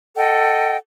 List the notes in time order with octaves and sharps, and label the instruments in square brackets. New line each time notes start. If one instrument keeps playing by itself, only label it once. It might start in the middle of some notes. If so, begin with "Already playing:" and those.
[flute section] A4 D#5 F#5 G5